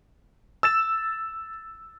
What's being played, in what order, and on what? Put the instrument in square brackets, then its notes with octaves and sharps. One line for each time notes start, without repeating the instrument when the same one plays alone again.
[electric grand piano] E6 A6 E7